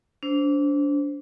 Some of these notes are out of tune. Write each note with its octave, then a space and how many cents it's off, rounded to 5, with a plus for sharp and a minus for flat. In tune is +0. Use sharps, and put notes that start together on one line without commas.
D4 -30 C5 -5